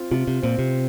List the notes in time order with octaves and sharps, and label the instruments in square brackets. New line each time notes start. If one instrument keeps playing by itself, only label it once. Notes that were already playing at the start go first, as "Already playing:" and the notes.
Already playing: [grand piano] C4 F4
[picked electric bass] C3 [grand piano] F4
[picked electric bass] C3
[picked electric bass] A#2 [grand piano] C4
[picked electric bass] C3